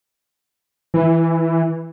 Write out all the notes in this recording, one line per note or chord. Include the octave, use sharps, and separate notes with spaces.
E3